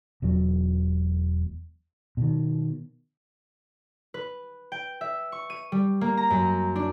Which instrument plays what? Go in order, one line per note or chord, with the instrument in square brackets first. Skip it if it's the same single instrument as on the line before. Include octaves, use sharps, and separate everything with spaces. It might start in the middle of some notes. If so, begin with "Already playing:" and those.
[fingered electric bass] E1 E2 F#3
B2 D#3
[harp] B4
G5
E5
C#6
D#7
G3
A#3
A#5
F#2
D4